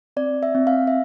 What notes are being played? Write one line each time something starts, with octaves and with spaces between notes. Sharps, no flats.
C4 D5
E5
C4
F5
E5